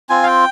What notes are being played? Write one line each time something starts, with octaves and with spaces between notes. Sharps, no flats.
C4 F4 G#5
F5
G5